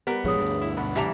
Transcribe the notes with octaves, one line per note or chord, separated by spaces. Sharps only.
G3 B3 A#4
A#1 G#2 F3 G#4 C#5 D#6
D2 G2
E4
B1 B3 B5
C2 E3 G3 E5 A5 A#5